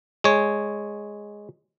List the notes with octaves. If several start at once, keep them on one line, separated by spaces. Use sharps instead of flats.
G#3 C#5